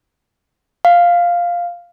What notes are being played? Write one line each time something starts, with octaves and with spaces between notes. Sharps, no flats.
F5